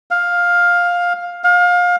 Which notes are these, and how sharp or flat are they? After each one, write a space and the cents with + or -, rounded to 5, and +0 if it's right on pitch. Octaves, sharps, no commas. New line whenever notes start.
F5 +10
F5 +30